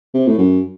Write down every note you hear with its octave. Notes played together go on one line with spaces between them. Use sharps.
C3
A2
F#2